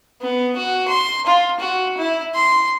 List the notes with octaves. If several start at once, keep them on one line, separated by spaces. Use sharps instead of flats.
B3
F#4
C6
F4
F#4
E4
C6